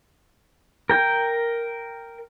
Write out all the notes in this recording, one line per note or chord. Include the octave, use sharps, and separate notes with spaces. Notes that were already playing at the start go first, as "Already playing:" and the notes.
A#4 G5